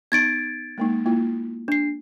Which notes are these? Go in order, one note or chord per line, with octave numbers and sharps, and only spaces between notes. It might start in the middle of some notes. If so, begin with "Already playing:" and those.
B3 D#4 G#6 A6 D7
G#3 A#3 D#4
A#3 E4 F4
D4 C7